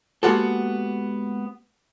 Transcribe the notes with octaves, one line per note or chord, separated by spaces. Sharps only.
G#3 A#3 B3 F#4 G4 A4